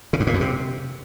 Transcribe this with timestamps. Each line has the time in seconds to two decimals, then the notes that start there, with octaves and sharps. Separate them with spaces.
0.13 C#3
0.20 G2
0.27 A#2
0.34 F#2
0.41 C3